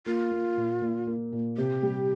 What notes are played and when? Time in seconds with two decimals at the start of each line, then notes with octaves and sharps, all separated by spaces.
0.06 A#3 F4
0.31 A#3
0.57 A#2
0.82 A#2
1.07 A#3
1.33 A#2
1.57 C3 G4
1.83 G3